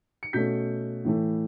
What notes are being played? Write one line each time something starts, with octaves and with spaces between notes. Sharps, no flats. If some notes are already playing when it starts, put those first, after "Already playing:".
C#7
B2 A3 C#4 G6 B6
A2 E3 A3